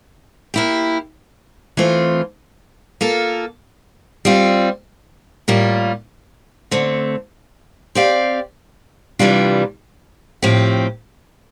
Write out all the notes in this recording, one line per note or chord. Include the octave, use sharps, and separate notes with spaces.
A#3 E4 G4
E3 A3 C4 F4
A#3 F4 A4
G3 C4 F4
A2 G3 A#3 F4
D3 A3 C4
C4 G4 D5 F5
C3 E3 G3 D4 F4
A2 F3 C4 G4